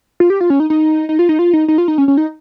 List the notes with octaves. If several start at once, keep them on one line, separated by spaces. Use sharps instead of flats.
F4
G4
F4
C#4
D#4
D#4
D#4
F4
D#4
F4
D#4
D#4
F4
D#4
C#4
C#4
D#4